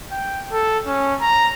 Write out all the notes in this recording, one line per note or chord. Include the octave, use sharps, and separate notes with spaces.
G5
A4
C#4
A#5